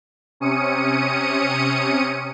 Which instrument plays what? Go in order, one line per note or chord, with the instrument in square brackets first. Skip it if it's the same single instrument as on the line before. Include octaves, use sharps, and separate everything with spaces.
[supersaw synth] C3 C#4 D#6 C#7 D#7